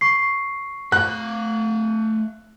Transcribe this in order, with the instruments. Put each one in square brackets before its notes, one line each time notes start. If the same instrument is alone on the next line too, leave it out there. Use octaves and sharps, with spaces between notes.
[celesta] C#6 C7
[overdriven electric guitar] A3 F5 [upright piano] F#6